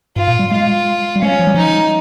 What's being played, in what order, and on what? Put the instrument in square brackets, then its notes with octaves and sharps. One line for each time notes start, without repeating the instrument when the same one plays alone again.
[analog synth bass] G#2 [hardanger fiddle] F4
[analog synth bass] A#2
G3
[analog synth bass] G#3 [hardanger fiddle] F4
[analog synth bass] G3
[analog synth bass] G#3 [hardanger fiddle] C#4
[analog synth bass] F3
G3
[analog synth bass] F3 [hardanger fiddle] D#4